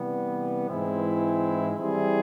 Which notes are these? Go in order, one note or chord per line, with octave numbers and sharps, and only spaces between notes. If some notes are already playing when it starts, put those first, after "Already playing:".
Already playing: C3 E3 G3 B3
G#2 E3 G#3 C4 E4
E3 G3 C4 E4 G#4